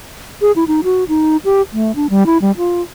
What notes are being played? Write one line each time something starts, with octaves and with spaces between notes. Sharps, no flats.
G#4
E4
D#4
F#4
D#4
G4
A3
D4
G3
E4
G3
F4